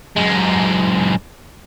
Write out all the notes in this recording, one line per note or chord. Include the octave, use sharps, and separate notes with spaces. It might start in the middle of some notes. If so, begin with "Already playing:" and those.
F#2 G#3